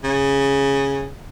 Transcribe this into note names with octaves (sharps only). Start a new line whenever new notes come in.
C#3